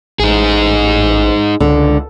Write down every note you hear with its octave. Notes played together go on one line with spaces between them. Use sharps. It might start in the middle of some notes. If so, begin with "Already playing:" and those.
A1 D#4 G#4
C#2 D3